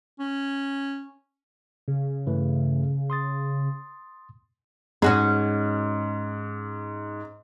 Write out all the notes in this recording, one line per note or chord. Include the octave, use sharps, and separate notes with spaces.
C#4
C#3
G2 E3 A3
C6 D#6 A6
G#2 C#4 F#4 G#4